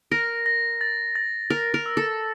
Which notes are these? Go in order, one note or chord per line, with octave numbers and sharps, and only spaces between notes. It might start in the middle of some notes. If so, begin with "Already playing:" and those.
A#4 A#6
A#6
A6
A6
A#4 A#6
A#4
E6
A4